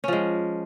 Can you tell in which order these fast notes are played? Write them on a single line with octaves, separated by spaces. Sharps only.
C#4 F3 G#3